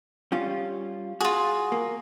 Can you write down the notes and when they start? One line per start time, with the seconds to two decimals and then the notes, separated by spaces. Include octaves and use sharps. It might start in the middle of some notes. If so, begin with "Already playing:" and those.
0.32 G3 C#4 F4
1.21 F4 F#4 G#4
1.72 A#3